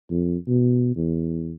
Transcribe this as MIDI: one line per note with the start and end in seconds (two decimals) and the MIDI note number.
0.11 0.37 41
0.48 0.93 47
0.96 1.53 40